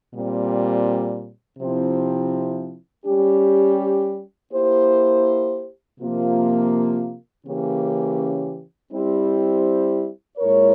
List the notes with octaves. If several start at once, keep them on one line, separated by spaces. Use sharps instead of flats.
A#2 G3 C4
C3 F3 C4 E4
G3 C#4 G4
A#3 E4 G4 C5
C3 F3 A#3 F4
C#3 E3 A#3 C#4 G4
G3 C4 E4 G4 C5
A#2 G#3 E4 A#4 C#5